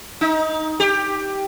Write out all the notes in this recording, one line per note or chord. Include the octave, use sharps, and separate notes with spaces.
D#4
G4